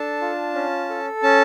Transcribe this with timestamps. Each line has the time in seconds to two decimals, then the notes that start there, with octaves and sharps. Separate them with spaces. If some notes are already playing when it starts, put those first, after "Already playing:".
Already playing: D4 A4 A5
0.21 F4
0.55 C#4
0.89 A4
1.23 C#4 A5